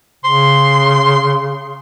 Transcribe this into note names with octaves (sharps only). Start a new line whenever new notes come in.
C#3 C6